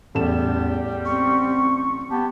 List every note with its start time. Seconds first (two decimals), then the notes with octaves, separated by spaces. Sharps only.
0.15 A1 E2 G3 A4 E7
1.05 C4 C#6
2.10 B3 G4 A5